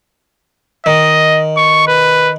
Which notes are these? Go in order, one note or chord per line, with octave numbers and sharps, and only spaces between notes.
D#3 D#5
C#6
B4